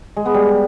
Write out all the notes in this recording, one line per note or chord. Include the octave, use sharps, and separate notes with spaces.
G#3
B3
G3